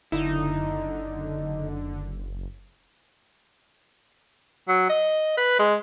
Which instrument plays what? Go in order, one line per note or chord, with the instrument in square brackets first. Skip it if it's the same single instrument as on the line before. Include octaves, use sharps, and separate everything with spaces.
[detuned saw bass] F#1 [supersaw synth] D3 [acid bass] D#4 [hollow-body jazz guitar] E4
[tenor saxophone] F#3
D#5
B4
G#3